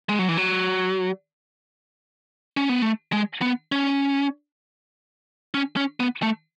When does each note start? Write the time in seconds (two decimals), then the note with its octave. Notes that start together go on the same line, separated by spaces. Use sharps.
0.09 G#3
0.19 F#3
0.28 E3
0.37 F#3
2.57 C#4
2.69 B3
2.82 A3
3.12 G#3
3.42 B3
3.72 C#4
5.54 C#4
5.77 C#4
6.00 B3
6.22 A3